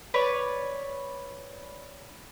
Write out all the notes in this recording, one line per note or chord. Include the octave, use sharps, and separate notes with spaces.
B4 C#5 D5